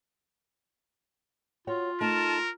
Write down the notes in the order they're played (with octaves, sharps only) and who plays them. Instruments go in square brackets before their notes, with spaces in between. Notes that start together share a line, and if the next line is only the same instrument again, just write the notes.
[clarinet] F4 [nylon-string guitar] F#4 C#5 G5
[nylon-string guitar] A3 D#4 [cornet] A#4 [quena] A5